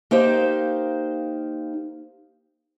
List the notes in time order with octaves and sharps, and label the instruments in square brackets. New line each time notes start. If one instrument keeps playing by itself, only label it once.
[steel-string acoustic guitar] A#3 D#4 G4 C5 F5